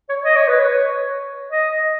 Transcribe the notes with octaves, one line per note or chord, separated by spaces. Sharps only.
C#5
D#5
C#5
B4
C#5
D#5